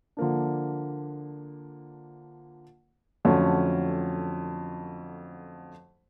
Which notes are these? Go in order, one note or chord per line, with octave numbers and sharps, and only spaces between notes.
D3 F3 A#3 D4
F2 D3 F#3 A3 C#4